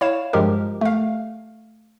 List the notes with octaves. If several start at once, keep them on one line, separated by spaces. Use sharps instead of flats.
E4 C#5 F5 E7
G2 F3 G#3 G4 A#4
A3 F5